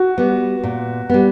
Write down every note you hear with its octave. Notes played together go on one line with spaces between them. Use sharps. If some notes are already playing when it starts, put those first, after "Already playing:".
Already playing: F#4
G3 B3
A#2
G3 B3